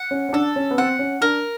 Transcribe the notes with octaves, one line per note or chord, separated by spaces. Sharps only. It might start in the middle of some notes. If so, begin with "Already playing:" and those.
Already playing: F#5
C#4
C#4
D4 A4
C#4
B3
C4 F#5
C#4
D4 A#4